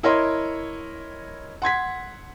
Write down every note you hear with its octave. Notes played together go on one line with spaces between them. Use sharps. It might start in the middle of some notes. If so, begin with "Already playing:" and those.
E4 A#4 C#5 D#5 C6
F#5 C6 G#6 B6